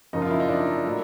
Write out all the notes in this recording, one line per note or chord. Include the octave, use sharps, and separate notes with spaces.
F#2 C#3 F3 A#3 D#4
F4
E4
D#4
D4
A2 F#3 A#3